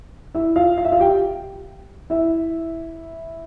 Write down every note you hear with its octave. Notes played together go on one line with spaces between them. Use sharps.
E4 E5
F4 F5
F5
E5
F4 F5
G4 G5
E4 E5